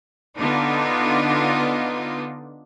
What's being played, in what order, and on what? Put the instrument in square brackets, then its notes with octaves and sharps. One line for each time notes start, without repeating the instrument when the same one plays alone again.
[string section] D3 B3 D4 D#4 F4